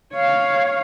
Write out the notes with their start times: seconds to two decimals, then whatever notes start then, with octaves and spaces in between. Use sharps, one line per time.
0.13 C#5 F5